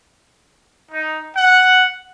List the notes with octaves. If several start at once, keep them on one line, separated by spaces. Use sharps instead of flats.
D#4
F#5